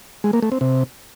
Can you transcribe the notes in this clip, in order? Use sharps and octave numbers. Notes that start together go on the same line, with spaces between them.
G#3
A#3
A3
C4
C3